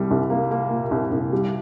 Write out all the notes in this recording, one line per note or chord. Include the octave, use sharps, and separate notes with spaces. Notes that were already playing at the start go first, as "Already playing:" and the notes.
Already playing: C2 G3
C2
A#3
A#3
A#2
C2
C2
G3